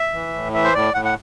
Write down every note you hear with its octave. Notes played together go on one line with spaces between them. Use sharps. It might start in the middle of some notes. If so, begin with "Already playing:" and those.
Already playing: E5
E3
A2
E3 E5
C5
A2 D5
A2 F#5
F#5